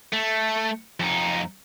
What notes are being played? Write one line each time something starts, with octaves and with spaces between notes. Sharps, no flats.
A3
F2 D#4